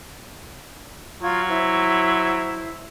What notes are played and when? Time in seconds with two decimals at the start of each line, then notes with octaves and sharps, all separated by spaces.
1.22 F#3 F4 G#6
1.49 E4 C5